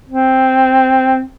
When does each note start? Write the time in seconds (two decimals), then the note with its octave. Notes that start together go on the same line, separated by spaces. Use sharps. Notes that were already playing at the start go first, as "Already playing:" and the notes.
0.08 C4